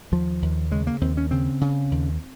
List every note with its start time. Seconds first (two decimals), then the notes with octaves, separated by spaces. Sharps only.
0.12 D#2 F3
0.42 D#2
0.71 C#3 G#3
0.87 A#3
1.01 D#2 C4
1.17 C#4
1.31 C#3 C4
1.61 C#3
1.91 D#2